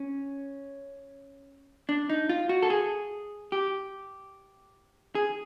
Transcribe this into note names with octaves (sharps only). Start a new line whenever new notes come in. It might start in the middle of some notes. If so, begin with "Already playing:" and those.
Already playing: C#4
D4
D#4
F4
F#4
A4
G#4
G4
G#4